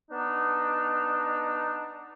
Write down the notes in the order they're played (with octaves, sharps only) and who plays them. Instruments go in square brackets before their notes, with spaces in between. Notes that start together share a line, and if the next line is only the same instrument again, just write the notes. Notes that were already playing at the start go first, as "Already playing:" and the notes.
[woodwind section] B3 D4 D#4